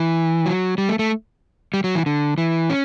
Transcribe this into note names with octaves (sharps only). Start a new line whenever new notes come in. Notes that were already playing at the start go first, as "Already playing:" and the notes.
Already playing: E3
F#3
G3
A3
A3
G3
F#3
E3
D3
E3
C#4